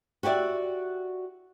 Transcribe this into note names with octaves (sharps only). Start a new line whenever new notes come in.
F#4 G4 A#4 D5 E5